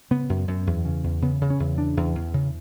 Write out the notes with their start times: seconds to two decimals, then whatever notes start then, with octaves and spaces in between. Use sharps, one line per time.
0.11 C#3 B3
0.29 F#2
0.48 F#2
0.67 E2
0.85 C#3
1.04 E2
1.22 C#3 B3
1.41 C#3
1.50 C#4
1.60 E2
1.78 C#3 D4
1.97 E2
2.15 E2
2.34 C#3